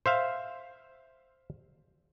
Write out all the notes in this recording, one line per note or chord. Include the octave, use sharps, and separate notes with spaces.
C5 E5 F5